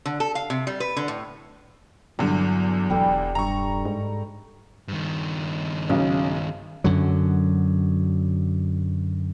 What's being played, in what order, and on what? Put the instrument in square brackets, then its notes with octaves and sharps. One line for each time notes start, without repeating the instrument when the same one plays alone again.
[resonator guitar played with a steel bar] D3
A4
F5
C3
G3
B4
D3
A2
[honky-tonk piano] E2 D3 [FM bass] G2 [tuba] F#3
[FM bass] E1 [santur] G3 G4 A4
[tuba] G2 [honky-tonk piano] A#5 C#6
[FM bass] G#2
[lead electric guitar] G2 D#3
[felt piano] B1 C#3 [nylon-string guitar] C#4
[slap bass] F#2 D3 F#3